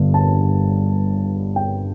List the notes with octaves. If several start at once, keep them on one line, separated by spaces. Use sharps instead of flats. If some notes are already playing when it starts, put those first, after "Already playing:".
Already playing: G1 G2 D3
A5
G5